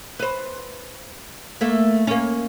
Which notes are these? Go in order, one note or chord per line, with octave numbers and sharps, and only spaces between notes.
B4 C5
A3 A#3
A#3 C#4